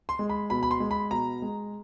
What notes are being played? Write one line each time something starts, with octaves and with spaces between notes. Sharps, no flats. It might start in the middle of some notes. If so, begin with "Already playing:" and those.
C6
G#3
B5
B2 B5
B5
C6
G#3
B5
B2 A#5
G#3